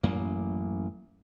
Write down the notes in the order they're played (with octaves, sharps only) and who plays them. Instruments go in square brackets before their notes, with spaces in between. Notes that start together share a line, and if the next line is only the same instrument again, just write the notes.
[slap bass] A1 F#2 A#3